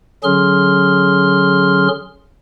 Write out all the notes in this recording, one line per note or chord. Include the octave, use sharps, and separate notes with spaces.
D3 F#3 C#4 G#4 C6 F6